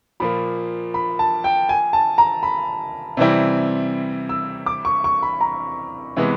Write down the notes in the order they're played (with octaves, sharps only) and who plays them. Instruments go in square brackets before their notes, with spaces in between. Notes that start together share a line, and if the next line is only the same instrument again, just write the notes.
[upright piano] A#2 F3 A#3 [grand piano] B5
[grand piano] B5
A5
G5
G#5
A5
A#5
B5
[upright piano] C3 E3 G3 C4 E4
[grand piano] E6
D6
C#6
C#6
B5
A#5
[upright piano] C3 E3 G#3 B3